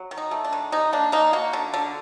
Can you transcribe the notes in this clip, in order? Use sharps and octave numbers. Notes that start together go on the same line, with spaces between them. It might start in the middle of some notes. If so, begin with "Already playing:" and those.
Already playing: F#3
D#3
D#4
A3
D4
D#3
C3 D#4
A#3 D4
A#3 D#4
A#3 F#4
D3
D3